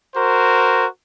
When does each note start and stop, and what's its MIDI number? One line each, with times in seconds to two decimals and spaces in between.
0.15 0.86 66
0.15 0.86 70
0.15 0.86 72